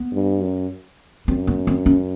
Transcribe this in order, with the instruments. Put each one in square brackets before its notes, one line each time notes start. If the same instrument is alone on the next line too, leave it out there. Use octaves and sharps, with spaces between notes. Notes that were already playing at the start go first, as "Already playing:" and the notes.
Already playing: [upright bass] B3
[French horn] G2
F#2
[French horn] F#2 [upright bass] C4
[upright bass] B3
C4
C#4